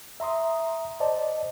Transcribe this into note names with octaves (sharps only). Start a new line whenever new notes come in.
E5 A#5 C6 D#6
C5 D5 D#5 A5